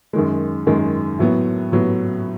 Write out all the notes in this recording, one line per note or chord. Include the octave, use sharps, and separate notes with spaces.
F#2 D#3 G#3
F#2 D#3 G#3
A2 F#3 B3
A2 F#3 B3